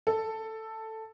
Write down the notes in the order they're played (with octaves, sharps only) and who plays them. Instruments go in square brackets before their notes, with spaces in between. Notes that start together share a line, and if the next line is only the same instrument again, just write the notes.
[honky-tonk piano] A4